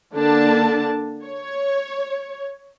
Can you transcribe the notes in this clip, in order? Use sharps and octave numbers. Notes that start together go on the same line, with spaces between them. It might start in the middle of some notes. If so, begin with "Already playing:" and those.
D3 A#3 D4 A5
C#5